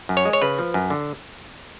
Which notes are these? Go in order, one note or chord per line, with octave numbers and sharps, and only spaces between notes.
F#2
C#5
G#3
C#5
C#3 B4
F3
F#2
D3